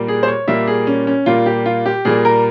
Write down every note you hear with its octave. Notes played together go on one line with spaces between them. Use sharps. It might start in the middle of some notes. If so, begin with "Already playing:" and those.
Already playing: A#2 G3 A#3
G#4
C5
C#5
A#2 G3 A#3 E5
G#4
C#4
C#4
A#2 G3 A#3 F4
G4
F4
G4
A#2 G3 A#3 G#4
A#4